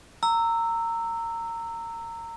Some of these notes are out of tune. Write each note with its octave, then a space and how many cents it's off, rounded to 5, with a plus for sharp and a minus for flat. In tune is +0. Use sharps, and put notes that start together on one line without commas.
A#5 -20 E6 +0